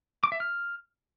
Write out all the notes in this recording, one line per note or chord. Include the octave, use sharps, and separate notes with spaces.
D6
E5
F6